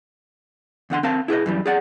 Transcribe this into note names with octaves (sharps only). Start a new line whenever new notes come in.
E2 D3 F#5 C6
C4 A#4 F5 A5
E4 G#4 B4 D#5
F#2 E3 G3
G#4 D5 F#5